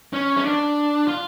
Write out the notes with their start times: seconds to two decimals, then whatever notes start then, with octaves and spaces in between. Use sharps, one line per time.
0.13 C#4
0.37 C#4
0.44 D4
1.08 F4